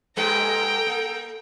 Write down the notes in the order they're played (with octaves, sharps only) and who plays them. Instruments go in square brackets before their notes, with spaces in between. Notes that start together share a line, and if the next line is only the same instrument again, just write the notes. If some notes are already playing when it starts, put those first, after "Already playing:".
[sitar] G#2 G3 B4 [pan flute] A4 [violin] G5 A#5
[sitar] A#3